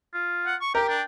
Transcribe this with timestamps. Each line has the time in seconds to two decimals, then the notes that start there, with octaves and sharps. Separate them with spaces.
0.14 F4
0.46 F#5
0.61 C#6
0.75 G4 A#4 G5
0.89 D4